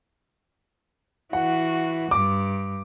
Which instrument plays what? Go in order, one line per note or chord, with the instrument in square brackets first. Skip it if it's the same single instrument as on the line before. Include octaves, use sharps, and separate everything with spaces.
[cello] E3 F#4 [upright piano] F#5
[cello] G2 [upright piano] D6